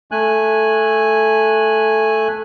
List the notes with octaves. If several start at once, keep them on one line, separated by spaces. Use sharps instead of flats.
A3 G#5 F#6